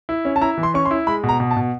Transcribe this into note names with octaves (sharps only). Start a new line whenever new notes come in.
E4
C#4
A5
E4 A#5
E3
C6
C#4 C#6
C6
E4
G#3 B5
B2
A#5
B2
A5
B2